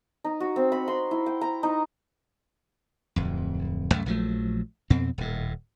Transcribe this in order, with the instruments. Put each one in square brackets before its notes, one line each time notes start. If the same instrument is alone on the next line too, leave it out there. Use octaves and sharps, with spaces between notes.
[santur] D#4
F#4
C4
B5
C6
E4
G5
A#5
D#4
[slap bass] D1 F2
C2 F#2 A3
A#1 F3 F#3 A3
F2 B2 C4
D#1 A2